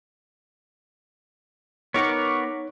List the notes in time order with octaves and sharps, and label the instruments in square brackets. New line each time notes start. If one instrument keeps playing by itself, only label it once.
[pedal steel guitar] B3 A#4 F#5 [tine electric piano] D#4 C#5 [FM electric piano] C#6 D6